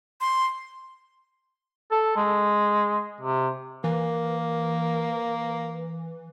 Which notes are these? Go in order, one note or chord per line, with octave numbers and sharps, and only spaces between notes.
C6
A4
G#3
C3
E3 A#3 A#4